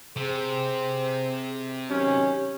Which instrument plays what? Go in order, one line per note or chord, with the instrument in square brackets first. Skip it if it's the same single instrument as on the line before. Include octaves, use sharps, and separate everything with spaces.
[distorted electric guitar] C3 [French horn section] C4 G#4
[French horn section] D#3 F#3 [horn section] C#4 [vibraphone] G4